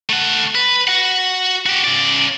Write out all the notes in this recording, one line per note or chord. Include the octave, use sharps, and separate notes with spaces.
A3 F#5
B4
F#4 F#5
F#4 G4
C#3 D5